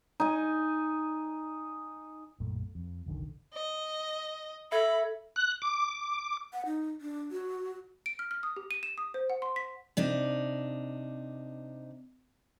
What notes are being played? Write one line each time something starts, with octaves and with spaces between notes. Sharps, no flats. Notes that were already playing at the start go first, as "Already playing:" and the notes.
D#4 G#5
B1 F#2 A#2 A3
F2
F1 B1 D3 D#3
D#5
A4 E5 B5 G#6
F#6
D6
F#5
D#4
D4
F#4
D7
F6
F6
D#6
G4
D#7
E7
D#6
C5
F#5
C6
B6
C3 D4 D#4